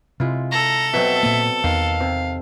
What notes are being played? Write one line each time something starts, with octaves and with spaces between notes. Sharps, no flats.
C3 G#3 E4 F4
A4 A#5
B2 F#3 C4 E5
A#2 A#3
E2 D#3 F5
C3